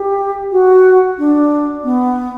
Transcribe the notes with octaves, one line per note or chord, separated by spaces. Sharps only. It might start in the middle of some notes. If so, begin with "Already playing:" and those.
Already playing: G4
F#4
D4
B3